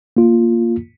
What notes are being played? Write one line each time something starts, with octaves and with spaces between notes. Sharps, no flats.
A#3 F4